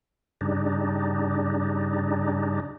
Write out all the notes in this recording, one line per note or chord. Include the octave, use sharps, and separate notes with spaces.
G2 C#3 G3 D4 D#4